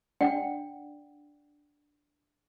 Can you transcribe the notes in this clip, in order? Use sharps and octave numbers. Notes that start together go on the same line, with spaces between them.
D4 D5 F#5 G5